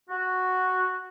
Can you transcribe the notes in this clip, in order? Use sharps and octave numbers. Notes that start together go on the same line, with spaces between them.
F#4